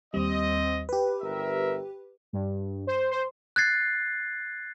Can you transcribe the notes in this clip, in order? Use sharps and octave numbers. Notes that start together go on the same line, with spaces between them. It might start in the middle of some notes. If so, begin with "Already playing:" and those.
D#2 G3 C4 D#5
G4 B4
G1 A#4 E5
G2
C5
C5
F#6 G#6 A6 C7